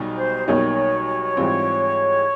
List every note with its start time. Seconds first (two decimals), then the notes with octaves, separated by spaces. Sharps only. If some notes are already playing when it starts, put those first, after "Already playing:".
Already playing: B1 B2 G3 D#4
0.18 C5
0.48 B1 B2 G3 A#3 D#4 C#5
1.37 G#2 E3 G3 C4 F4